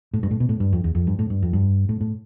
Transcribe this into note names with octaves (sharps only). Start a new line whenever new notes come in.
A2
G2
A2
B2
A2
G2
F2
E2
F2
G2
A2
G2
F2
G2
A2
A2